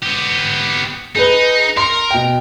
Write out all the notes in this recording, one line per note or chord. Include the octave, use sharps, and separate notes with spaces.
B3 G4
D#4 G#4 B4
A#4 C6
B2 G5